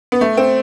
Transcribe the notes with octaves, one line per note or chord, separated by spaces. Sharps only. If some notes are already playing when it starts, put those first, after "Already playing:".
B3
A3
C4